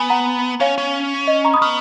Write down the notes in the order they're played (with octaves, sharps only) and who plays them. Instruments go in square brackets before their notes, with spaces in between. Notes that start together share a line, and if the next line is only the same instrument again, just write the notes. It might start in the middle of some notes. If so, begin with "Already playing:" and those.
Already playing: [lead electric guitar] B3 [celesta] G#5 B5
[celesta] F#5 A#5
[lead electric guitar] C#4 [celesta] C#5 F5
[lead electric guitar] C#4
[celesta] D#5
A#5 C#6
B5 D#6
[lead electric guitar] B3 [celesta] C#6 F6